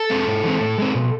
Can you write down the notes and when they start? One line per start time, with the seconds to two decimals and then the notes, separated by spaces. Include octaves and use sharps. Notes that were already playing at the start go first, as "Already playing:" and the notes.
Already playing: A4
0.10 G#3 C4
0.27 G#2
0.44 E3 G#3 C4
0.60 A2
0.78 G#3 C4
0.95 B2